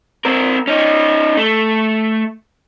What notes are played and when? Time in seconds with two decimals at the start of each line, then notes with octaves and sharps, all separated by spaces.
0.25 C4 A#4
0.68 C#4 D#4
1.37 A3